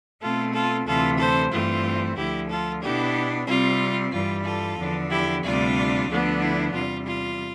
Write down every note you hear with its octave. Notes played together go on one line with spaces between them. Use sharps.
B2 A3 C4 F4 A4
F4 A4
D2 C3 E3 F4 A4
A4 C5
G2 E3 A3 C4 F4
D2 D3 F3 E4 G4
F4 A4
B2 B3 D4 E4 G4
C3 G3 C4 F4
G2 E3 G3 F4
F4 A4
E2 D3 F3 B3 D4
E4 G4
D2 C3 G3 D4 F4
D2 D3 F3 B3 D4
E4
E2 C3 G3 F4
F4